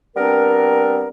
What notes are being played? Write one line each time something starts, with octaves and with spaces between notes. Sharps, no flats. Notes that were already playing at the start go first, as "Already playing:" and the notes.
G3 B3 C4 D4 A#4